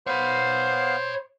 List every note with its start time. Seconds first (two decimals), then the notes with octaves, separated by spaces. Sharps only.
0.07 B3 C5 C#5 F5 B5